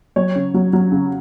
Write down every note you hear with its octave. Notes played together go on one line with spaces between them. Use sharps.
F#3 C#5
C#3
F#3
F#3
C#3